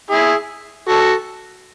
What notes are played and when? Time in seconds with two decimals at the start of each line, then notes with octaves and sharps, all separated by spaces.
0.10 E4 G#4
0.89 F#4 A4